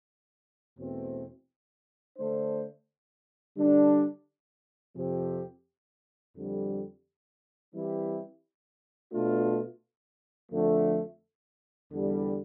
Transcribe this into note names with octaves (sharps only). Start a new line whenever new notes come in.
E2 B2 A3 C4
D3 A3 D4 A4 C5
D3 G3 D4
F2 C3 F3 C4 G4
F2 D3 G3
E3 G3 C4 E4 G4
B2 A3 D4 F4
F2 D3 F3 A3
E2 D3 G3